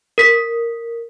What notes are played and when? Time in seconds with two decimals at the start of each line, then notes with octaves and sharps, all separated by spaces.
0.18 A#4 B6